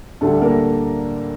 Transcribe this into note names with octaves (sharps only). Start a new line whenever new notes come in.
D2 D3 G3 A3 A4
A#3 A#4